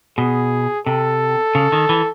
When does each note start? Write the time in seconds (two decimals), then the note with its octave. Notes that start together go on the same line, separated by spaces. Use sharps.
0.17 B2 G#4
0.86 C3 A4
1.55 C#3
1.72 D#3
1.89 E3